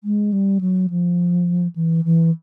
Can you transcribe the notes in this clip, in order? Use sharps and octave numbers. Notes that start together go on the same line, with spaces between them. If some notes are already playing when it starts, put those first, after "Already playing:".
G#3
G3
F#3
F3
E3
E3